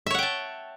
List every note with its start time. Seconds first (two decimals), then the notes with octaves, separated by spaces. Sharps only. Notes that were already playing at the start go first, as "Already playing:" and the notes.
0.07 E5
0.11 C#5
0.15 F#5
0.19 G5
0.23 A5